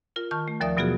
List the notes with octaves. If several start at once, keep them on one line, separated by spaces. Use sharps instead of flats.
F4 A#4
D#3 A5 C#6 F6
A3
D#2 F3 A#4 D5 E5 D#6
B2 F#3 B3 F4 F#4 G#4